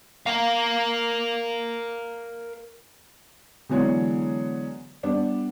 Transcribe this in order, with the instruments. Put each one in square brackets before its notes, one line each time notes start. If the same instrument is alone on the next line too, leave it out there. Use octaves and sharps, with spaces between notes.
[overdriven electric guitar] A#4 F5
[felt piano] D3 E3 F#3 G#3 B3 C#5
G3 B3 D4